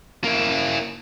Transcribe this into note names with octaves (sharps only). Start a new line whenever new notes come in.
A#3 E4